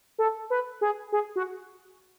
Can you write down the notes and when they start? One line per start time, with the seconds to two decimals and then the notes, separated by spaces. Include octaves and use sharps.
0.18 A4
0.50 B4
0.81 G#4
1.12 G#4
1.36 F#4